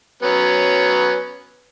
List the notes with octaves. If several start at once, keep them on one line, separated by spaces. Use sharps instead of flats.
F#3 B3 C#4